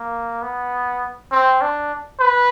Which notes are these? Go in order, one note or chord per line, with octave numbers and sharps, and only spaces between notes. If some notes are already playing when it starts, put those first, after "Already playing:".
Already playing: A#3
B3
C4
D4
B4